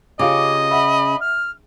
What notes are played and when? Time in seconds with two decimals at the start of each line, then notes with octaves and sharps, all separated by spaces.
0.19 C#3 F4 G4 D#5 D6
0.71 E5 F#5 B5
1.21 F6